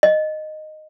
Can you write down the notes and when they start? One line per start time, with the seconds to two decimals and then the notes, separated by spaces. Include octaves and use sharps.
0.03 D#5